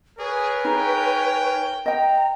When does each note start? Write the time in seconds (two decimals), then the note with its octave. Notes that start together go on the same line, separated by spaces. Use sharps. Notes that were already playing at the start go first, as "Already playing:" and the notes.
0.19 G#4 A#4 B4 C#5 G#5
0.65 D#4 G#4 G5
1.86 D#5 G5 A#5